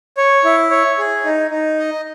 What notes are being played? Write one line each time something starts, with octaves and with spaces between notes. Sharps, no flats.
C#5
E4
C#5
G#4
D#4
D#4
D#5